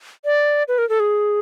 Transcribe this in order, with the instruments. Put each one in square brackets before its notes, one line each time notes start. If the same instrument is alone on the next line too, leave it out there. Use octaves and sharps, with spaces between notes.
[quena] D5
B4
A#4
A4
G#4